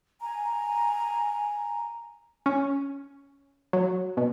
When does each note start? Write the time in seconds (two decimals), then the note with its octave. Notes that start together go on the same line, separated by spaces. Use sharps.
0.21 G#5 A#5
2.46 C#4
3.73 F#3
4.17 B2